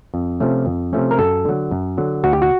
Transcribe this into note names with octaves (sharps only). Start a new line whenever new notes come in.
F2
C3 F3 A3 C#4
F2
C3 F3 A3 C#4
A#4
F#2 A4
D3 F#3
F#2
D3 F#3
D2 F#4
G4
F#4